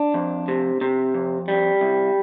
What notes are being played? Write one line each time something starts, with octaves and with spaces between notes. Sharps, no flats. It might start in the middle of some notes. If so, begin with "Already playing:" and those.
Already playing: D4
F2
C3
C3
F2
G3
C2